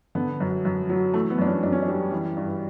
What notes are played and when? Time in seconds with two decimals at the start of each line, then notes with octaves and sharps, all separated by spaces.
0.15 D3 B3
0.40 F#2
0.65 F#2
0.89 F#3
1.14 E3 A3
1.30 B3
1.38 F#2 D4
1.46 C#4
1.63 F#2 D4
1.72 C#4
1.82 D4
1.88 G3
2.12 E3
2.37 G2